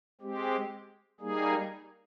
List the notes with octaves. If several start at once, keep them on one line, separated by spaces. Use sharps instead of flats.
G#3 C4 G4
G3 A#3 D#4 G#4